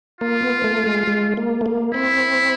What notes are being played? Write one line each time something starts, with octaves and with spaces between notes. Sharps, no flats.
A#3 F4
B3
A3
G#3
G#3
A#3
A3
A#3
C4 E4